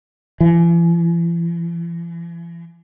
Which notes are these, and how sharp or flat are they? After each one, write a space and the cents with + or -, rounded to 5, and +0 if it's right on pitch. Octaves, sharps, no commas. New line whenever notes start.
E3 +45